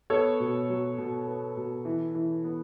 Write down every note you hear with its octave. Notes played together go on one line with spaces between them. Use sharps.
B3 A4 C#5
B2
F#3
B2
B3
B2
E3
E3
B3